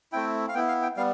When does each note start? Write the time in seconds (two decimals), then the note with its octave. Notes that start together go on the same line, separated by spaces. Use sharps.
0.12 A3 C4 E4 G5
0.49 F5
0.55 B3 E4 G5
0.68 F5
0.82 G5
0.97 G3 B3 F5